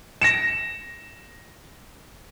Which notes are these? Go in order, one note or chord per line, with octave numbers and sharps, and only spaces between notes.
A#6 C#7 E7